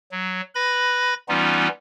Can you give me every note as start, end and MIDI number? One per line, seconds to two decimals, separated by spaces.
0.12 0.41 54
0.55 1.14 71
0.55 1.14 83
0.55 1.14 94
1.29 1.68 52
1.29 1.68 55
1.29 1.68 59
1.29 1.68 61
1.29 1.68 63
1.29 1.68 65